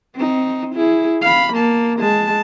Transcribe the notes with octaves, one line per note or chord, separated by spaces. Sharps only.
C4 D#4
E4 G#4
F5 B5
A#3 A5
G#3 A5